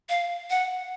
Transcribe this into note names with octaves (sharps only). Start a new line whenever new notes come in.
F5
F#5